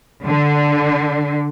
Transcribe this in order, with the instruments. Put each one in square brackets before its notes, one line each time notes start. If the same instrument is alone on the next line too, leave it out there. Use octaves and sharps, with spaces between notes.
[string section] D3